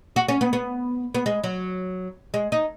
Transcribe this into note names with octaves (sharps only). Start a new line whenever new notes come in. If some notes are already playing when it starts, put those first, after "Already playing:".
F#4
C#4
B3
B3
B3
G#3
F#3
G#3
D#4